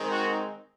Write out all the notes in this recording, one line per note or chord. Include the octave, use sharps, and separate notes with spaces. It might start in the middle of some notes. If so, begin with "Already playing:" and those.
Already playing: D#3 G#3 C4 D#4
F#4